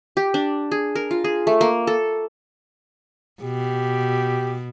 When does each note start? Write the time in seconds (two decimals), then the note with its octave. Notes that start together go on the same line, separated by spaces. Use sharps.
0.17 G4
0.34 D4
0.72 G#4
0.95 A#4
1.11 F4
1.24 G#4
1.47 A3
1.61 A#3
1.87 A4
3.42 B2 G4